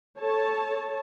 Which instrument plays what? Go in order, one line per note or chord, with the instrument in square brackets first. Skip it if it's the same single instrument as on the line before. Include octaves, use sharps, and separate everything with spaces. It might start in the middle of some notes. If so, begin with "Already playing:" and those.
[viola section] A4 C#5 A5